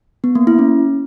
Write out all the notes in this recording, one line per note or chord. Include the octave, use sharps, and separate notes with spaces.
B3
A#3
E4
C#4